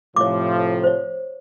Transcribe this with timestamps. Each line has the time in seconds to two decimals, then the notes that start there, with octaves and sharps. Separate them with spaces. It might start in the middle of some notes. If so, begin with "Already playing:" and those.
0.16 A2 C3 F3 C#5 D6
0.83 C5 C#5